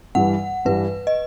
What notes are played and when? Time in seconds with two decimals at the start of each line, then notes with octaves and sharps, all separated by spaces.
0.15 G2 E3 G3 F#5
0.65 G2 E3 G3 B4
1.07 D#5